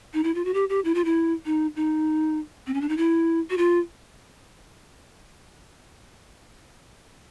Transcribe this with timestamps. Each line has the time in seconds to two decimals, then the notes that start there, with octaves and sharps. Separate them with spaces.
0.14 D#4
0.24 E4
0.35 F4
0.45 F#4
0.54 G4
0.69 G4
0.85 E4
0.95 F4
1.05 E4
1.46 D#4
1.76 D#4
2.67 C4
2.74 C#4
2.81 D4
2.89 D#4
2.97 E4
3.50 F#4
3.58 F4